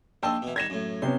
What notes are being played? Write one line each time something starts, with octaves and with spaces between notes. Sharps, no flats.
A#1 D#5 G5 A5 C6 E6
B2 E3
D#3 G3 A#4 G#6 A#6 E7
F#2 A2
C3 B3 C#4 C6